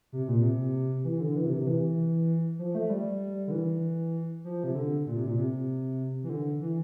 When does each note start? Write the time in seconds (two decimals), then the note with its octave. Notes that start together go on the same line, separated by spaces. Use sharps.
0.13 C3
0.28 A#2
0.43 C3
1.05 E3
1.20 D3
1.36 E3
1.46 C3
1.56 C3
1.67 E3
2.59 F3
2.75 A3
2.90 G3
3.47 D3
3.51 E3
4.44 F3
4.64 C3
4.75 D3
5.06 A#2
5.16 C3
5.26 A#2
5.38 C3
6.23 E3
6.30 D3
6.61 E3